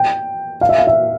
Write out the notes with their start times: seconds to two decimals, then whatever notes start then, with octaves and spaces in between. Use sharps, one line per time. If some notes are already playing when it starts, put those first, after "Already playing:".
Already playing: G5
0.61 F5
0.69 E5
0.78 F5
0.87 E5